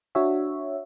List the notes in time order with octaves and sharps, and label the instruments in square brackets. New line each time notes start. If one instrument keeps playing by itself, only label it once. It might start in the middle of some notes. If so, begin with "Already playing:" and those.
[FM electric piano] D4 F#4 C#5 E5